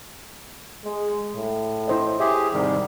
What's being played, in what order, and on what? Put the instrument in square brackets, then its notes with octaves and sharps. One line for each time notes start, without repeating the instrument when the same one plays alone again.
[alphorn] G#3
A2
[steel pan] E4 C5 D#5
[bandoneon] G4 G#4 [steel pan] E5
[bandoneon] G#2 C3 D#3 [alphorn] G3